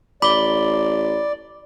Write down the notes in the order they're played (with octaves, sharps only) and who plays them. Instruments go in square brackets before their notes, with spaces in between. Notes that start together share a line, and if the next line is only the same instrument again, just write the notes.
[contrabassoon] A1 [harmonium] D5 [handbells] B5 [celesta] D6 G7